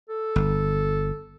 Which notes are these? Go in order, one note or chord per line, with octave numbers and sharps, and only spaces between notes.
A4
G1